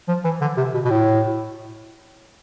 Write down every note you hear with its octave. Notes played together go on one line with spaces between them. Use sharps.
F3
E3
D3
C3
B2
B2
A2